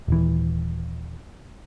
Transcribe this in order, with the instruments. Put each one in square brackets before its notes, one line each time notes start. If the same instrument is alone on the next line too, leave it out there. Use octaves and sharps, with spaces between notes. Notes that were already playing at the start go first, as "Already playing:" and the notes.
[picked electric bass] D#1 E3